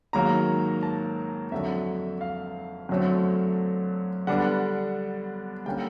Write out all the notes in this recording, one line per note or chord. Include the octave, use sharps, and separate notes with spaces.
G#2 D#3 F#3 A#3 A#5
A5
F2 D3 F#3 E5
F5
F#2 D3 F#3 A3 C4
D3 G3 B3 D4 F#5
D3 G3 A#3 C#4 G5